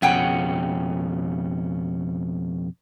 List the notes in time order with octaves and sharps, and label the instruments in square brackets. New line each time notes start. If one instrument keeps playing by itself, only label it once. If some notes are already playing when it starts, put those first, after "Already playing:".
[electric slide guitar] F2 B2 C#4 [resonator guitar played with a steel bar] G#4 F#5 G5